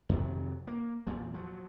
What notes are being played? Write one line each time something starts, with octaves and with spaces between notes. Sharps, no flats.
F2 C3 D#3 F#3
A#3
E2 A#2 F3
F3 F#3